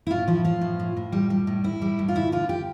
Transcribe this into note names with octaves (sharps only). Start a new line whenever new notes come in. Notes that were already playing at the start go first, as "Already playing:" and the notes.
E4
A2 F4
F3 E4
F3 F4
A2
A2
A2
G3
G3
A2
A2 E4
G3
A2
F4
D2 E4
D3 F4
G4